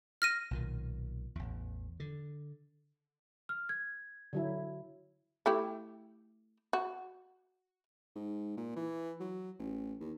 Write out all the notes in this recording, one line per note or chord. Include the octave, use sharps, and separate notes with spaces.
F6 A#6 D#7
B1 A#2 D#3
A1 E2
D3
F6
G#6
D3 F#3 E4
A3 E4 G4
F#4
G#2
A#2
E3
F#3
A1
D#2